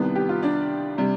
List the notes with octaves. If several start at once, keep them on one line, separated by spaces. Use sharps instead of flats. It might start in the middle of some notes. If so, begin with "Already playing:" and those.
Already playing: C2 C3 D#3 G3 B3 B4
G4
F4
D4 D5
C3 G3